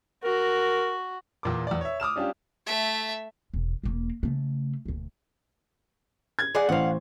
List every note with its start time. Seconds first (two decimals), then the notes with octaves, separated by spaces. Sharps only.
0.24 F#4 A#4
1.43 E2 A#2 D6
1.67 E2 D5
1.81 C#5 E5
2.00 D6 D#6 F6 E7
2.16 G3 C#4 D4 F4 G4
2.66 A3 E5
3.54 E1
3.84 E1 A#3
4.23 C#3 A3
4.86 E1 D2
6.39 G#6
6.55 G#4 D5 F#5
6.69 A1 C5 F5 F#5